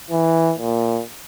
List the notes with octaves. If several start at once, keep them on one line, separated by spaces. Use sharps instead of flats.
E3
A#2